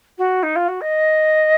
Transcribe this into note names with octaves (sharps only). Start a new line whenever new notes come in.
F#4
D#4
F4
F#4
D#5